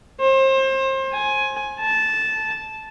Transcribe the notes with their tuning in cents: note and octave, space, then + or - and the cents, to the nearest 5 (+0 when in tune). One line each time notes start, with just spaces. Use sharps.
C5 +30
G#5 +10
A5 -10